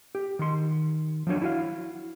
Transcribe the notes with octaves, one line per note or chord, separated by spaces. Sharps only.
G4
D#3 C6
F3 F#3 D4 C#5
E4 F#4 F5